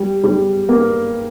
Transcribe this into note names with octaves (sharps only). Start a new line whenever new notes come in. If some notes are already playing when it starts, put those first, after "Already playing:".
Already playing: G3
G3
A#3